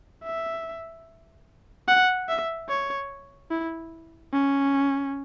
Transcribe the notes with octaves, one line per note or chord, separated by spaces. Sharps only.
E5
F#5
E5
C#5
E4
C#4